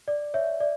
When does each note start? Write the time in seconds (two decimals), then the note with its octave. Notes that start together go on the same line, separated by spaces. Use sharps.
0.08 D5
0.34 C#5 E5
0.60 D5